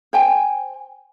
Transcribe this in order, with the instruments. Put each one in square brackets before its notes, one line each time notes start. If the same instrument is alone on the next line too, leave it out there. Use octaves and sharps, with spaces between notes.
[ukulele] C5 G5 G#5